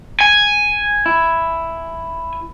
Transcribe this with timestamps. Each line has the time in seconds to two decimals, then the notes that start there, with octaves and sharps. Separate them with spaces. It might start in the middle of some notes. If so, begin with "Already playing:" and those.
0.21 G#5
1.06 E4